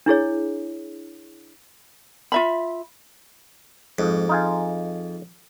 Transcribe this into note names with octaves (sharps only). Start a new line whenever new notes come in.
D4 E4 G#4 C#5
F4 E5 B5
F2 G#2
D#4 F4 G#4